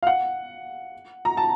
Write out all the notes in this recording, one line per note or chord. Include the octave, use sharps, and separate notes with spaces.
F5
F#5
A#5
A5